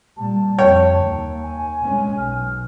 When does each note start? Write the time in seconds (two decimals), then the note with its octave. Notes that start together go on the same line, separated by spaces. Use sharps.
0.17 A#2 G3 A5
0.58 F2 C#5 G5
0.99 D#2
1.43 G#5
1.82 G#3 C#4
2.18 B1 F6